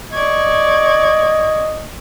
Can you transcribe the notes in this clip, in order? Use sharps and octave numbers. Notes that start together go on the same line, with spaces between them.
D5 D#5 C#6 G#6